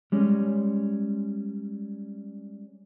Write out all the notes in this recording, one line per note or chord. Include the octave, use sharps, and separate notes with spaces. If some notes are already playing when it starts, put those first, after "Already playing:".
G3 G#3 C#4